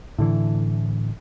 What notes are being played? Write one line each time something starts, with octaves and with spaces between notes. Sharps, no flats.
A2 D3 E3